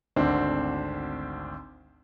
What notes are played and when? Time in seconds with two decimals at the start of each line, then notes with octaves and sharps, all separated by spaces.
0.16 G#1 D2 C4 D4